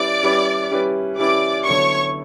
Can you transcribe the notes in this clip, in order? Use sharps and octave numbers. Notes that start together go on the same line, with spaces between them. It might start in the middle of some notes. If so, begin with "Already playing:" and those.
Already playing: G3 C#4 E4 G4 B4 D5 D6
G3 C#4 E4 G4 B4
G3 C#4 E4 G4 B4
G3 C#4 E4 G4 B4 D5 D6
D3 F#3 B3 E4 C#5 C#6